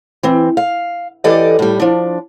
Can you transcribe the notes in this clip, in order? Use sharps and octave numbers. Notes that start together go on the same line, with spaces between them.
E3 C4
F5
E3 G4 A4 D5 D#5
A2 G3
F3 D4